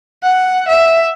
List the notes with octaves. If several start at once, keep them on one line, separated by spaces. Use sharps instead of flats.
F#5
E5